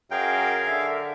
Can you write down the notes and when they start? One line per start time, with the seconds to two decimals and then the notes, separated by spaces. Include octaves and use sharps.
0.11 F#2 G#4 A#4 F5 G5
0.67 D3 E5